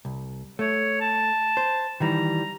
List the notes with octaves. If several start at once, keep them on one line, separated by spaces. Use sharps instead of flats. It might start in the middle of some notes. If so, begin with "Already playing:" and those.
C2
A3 C#5
A5
C5
D#3 E3 G3 A#5